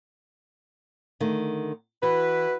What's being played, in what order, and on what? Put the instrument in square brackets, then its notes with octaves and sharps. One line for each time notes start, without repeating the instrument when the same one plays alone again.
[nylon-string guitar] D3 D#3 A3
[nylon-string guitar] E3 [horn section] E4 F#4 B4